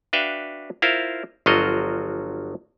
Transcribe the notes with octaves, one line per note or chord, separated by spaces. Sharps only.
D4 F#4 B4 E5 F5 G5
E4 F4 A#4 C5 F5
G1 F3 F#3 F4 F#4 D#5